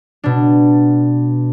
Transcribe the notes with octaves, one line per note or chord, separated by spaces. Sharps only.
B2 D4